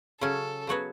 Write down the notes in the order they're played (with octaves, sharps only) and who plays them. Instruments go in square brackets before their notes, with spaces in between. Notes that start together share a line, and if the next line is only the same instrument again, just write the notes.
[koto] C#3 F#3 C#4 [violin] A4
[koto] C#3 F#3 B3 F#4 C#5